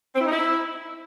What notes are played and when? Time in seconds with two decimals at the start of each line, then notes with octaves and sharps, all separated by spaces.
0.16 C4
0.21 E4
0.26 D#4
0.31 E4